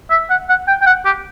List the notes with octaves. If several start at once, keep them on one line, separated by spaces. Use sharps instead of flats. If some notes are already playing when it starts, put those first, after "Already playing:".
E5
F#5
F#5
G5
G5
F#5
G4